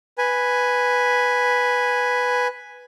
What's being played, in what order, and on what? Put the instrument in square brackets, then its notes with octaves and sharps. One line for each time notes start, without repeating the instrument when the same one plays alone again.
[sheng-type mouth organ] B4 G#5